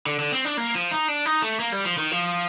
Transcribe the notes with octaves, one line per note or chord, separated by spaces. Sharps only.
D3
D3
C4
D4
A#3
F3
D#4
D4
D#4
A3
A#3
G3
F3
D#3
F3